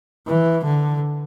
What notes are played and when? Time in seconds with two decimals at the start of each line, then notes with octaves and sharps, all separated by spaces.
0.27 E3
0.65 D3